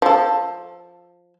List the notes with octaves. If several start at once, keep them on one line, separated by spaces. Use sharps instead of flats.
F3 A4